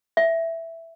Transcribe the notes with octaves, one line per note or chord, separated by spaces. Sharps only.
E5